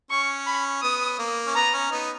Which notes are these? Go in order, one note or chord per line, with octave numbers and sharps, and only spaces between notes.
C#4 C#6
B5
B3 D#6
A#3
C#4
B3 A#5
C#4
B3 D#4